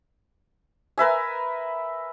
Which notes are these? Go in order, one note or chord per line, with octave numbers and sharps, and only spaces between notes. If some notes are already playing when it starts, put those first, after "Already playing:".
A#4 B4 E5 G#5